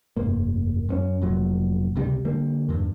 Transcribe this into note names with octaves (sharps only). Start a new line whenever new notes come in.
F1 G2 A#3
F#2 B3 C#4
F1 A#2 F#3
C#2 C3 D#3 G3
D3 G3 A#3
E2 G2